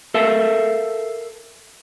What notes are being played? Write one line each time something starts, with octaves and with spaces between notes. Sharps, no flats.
A4 A#4 E5 F5 A5